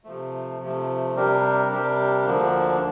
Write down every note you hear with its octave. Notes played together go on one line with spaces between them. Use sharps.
C3 F3 A3
C3 F3 A3
C3 G3 D4 G4 A#4
C3 G3 D4 G4 A#4
D2 D3 F3 A#3 D4